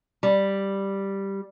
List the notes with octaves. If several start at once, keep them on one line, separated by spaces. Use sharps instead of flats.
G3